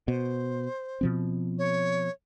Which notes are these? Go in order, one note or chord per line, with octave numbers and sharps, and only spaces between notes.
B2 C5
B2 F3 C4
C#5